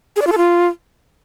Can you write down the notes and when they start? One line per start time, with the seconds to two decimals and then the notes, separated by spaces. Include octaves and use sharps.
0.16 G#4
0.21 D5
0.27 F4
0.32 A4
0.37 F4